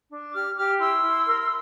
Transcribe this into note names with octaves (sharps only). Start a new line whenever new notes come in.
D4
G4 D6 F6
G4 D6 F6
E4 C6 E6
E4
A#4